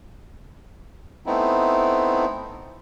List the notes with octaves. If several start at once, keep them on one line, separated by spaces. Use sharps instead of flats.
A3 B3 C4 D#4 E4